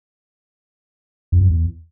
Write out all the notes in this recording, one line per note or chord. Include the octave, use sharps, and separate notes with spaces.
F2
F#2
E2